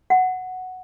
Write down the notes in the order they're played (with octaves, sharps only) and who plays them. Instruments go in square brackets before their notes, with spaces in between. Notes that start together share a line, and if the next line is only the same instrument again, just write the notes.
[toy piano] F#5